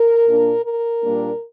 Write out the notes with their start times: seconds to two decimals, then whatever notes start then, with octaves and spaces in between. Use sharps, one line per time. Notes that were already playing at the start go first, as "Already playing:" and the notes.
Already playing: A#4
0.27 A#2 A#3 D4
0.65 A#4
1.03 A#2 G3 A#3 D4